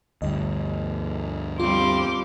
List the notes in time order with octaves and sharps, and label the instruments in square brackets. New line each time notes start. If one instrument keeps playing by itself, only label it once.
[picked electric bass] D2 G2 [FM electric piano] D#5
[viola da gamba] F3 G3 C4 [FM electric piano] F4 [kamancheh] C6 D6